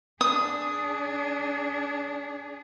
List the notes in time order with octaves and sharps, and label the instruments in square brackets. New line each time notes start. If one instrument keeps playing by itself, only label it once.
[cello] D4 G#4 [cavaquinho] D#6